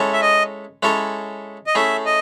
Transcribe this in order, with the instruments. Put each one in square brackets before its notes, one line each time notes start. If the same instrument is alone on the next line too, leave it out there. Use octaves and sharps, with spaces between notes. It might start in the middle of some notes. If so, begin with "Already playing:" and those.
Already playing: [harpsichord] G#3 C#4 E4 A4 C#5
[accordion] E5
D#5
[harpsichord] G#3 C#4 E4 A4 C#5
[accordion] D#5
[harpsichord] A3 C#4 E4 G#4 [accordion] E5
[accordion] D#5